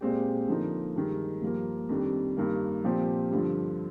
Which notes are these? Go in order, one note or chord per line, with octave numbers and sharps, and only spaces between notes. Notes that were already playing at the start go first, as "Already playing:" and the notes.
A#2 G#3 C4 G4
D3 F3 A#3 D#4
G2 D#3 G#3
G2 F3 A#3
F2 D#3 G3 D4
G2 D#3 A#3
A#2 F3 C4 G4
G2 D3 F3